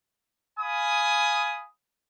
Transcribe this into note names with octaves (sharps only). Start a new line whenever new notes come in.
F5 G#5 B5 D#6